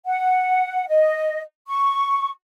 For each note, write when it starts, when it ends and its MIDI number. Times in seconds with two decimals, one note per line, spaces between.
0.06 0.85 78
0.88 1.42 75
1.68 2.29 85